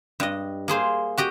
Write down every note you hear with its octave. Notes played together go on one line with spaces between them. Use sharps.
G2 D#5
A#3 G#4 C5 F5
F#4 G4 D#5